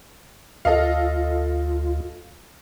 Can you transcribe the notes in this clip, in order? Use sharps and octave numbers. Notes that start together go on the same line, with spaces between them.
D2 F4 A4 D#5 F5